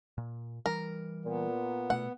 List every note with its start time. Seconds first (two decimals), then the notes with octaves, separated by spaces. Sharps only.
0.18 A#2
0.66 E3 G3 A#4
1.25 A#2 B3
1.90 B2 A3 F#5